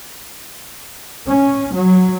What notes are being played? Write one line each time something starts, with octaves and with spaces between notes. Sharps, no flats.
C#4
F#3